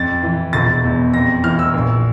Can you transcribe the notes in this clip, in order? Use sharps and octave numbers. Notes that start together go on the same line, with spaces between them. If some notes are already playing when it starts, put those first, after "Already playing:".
Already playing: F2 A6
E3
E1 A6
E2
F2 A#6
E3 F6
E6
A#1